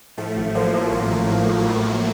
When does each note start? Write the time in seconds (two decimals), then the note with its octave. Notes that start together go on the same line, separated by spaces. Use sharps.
0.18 A2 F3 A3
0.37 A1
0.55 F3 F#3 A#3
0.74 F3
0.92 A1 F#3 A#3
1.10 A1
1.29 A2
1.48 A2
1.66 A2
1.85 A2